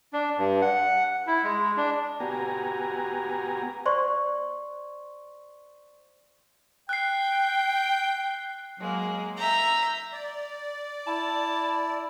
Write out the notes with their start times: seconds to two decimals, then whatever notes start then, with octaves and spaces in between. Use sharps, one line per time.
0.13 D4
0.38 G2
0.62 F#5
1.27 E4
1.44 G#3
1.77 D4
2.20 B3 F#4 G4 G#5 A#5
3.86 C5 D5 C6 C#6
6.89 G5 F#6 C7
8.78 F#3 G#3 A#3
9.38 E5 A#5 G6
10.13 D5
11.07 E4 A5